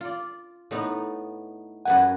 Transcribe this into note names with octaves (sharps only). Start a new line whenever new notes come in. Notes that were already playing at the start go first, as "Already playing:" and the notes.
F4 D5
A2 B3 D#4
F#2 B4 F#5 G#5